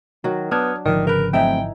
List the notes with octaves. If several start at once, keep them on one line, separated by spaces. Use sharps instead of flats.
D#3 F#3 F#4
B3 D4 D#6 F6 G#6
G#1 D3 D#3 F3 D5
C#3 A#4 B4 G5
E3 F#3 A3 C4 D#4 E5 G5